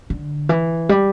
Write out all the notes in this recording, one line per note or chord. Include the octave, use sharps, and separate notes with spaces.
D3
E3
G3